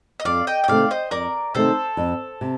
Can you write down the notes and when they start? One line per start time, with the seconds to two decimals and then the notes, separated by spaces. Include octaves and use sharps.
0.20 D#5
0.25 F2 D5 F5
0.47 D#5 G5
0.64 D#5
0.68 C3 D#3 A3 C4 D5 F5
0.91 C5 D#5
1.11 F2 A#4 D5
1.54 C3 D#3 A3 C4 A4 C5
1.97 F2
2.41 C3